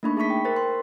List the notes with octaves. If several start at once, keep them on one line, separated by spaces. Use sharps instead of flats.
A3 A#3 D4 D#4 B5 C#6
G#4 E5 A5 B5 C#6 B6
G5
A#4 C5 A6
C6